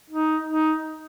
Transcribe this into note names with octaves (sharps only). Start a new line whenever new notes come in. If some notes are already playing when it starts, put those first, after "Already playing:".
D#4
D#4